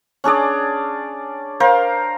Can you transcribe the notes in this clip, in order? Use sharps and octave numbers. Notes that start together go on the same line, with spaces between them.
C#4 D4 G#4 D5
A#4 C5 F5 G5